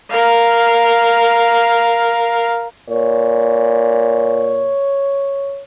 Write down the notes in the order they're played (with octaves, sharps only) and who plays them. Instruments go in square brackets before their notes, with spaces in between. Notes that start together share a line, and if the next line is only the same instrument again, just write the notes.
[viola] A#4 F5
[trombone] A#2 [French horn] C#5